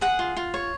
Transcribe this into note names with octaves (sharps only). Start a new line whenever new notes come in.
G#4 F#5
F4
F4
C#5